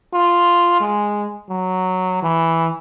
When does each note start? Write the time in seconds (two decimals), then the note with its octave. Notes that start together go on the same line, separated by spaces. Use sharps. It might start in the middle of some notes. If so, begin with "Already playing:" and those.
0.14 F4
0.81 G#3
1.50 F#3
2.23 E3